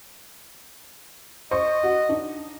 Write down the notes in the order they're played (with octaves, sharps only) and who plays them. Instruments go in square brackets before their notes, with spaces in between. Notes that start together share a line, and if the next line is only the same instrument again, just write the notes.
[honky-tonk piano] C5 C#6 [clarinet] D#5
[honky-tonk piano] F#4
D4 D#4